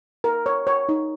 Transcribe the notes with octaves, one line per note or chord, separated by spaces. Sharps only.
A#4
C#5
C#5
D#4